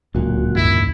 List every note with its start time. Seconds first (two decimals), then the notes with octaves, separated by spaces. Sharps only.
0.15 D1 C#2 A#2 F#3 F#4
0.56 E2 G2 D#3 E4